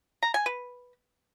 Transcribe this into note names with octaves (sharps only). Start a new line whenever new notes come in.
A#5
G#5
B4